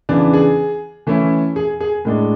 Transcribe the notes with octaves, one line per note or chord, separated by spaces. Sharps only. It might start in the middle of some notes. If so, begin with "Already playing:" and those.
C#3 E3 B3 D4
G#4
E3 A3 C#4 E4
G#4
G#4
A2 G#3 D4